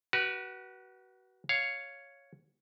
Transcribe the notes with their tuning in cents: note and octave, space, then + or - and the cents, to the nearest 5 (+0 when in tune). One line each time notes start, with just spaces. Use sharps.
F#4 +25 B4 -25
C#5 +0 F5 +0